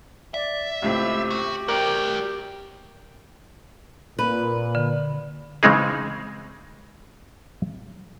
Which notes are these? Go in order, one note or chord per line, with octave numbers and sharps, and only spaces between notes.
D5 E5
C#2 A2 C4 G4
F#4
F#4 A#4 D5 G5
A#2 B4
D3
C#3 E3 G#3 C4 D#4 G#4